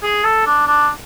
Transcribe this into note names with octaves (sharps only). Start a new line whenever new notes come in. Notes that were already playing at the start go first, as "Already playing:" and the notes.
G#4
A4
D4
D4